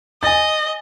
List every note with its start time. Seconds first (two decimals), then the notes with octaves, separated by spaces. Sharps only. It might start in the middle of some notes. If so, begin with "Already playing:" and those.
0.23 D#5 G#5 A6